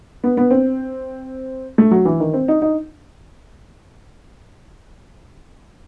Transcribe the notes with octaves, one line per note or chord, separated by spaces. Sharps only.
B3
B3
C4
A3
F#3
E3
D#3
C4
D#4
D#4